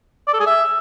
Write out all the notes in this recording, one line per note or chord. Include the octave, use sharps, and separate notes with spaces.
D5
A4
G#4
E5